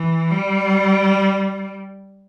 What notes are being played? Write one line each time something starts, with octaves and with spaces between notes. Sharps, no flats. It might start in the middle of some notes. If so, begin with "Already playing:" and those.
Already playing: E3
G3